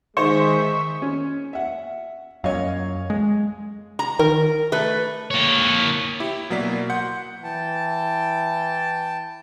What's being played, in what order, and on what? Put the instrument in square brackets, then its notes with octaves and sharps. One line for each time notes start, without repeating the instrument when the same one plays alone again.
[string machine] D#3 E5 [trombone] G#3 [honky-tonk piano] D#4 C5 [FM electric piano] C#6
[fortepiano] C#4
E5 F#5
[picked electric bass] F#2 [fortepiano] C#5 D#5 F5
[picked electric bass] G#3
[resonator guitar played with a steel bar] A#5
[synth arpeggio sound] D#3 [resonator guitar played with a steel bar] A#4
[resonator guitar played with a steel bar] A3 B4
[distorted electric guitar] A#3 C#5
[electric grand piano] E4 G4
B2 F#3 A#3 D5 B6
F#5 C6 G6 C#7
[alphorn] E3 [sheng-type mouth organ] G5 A5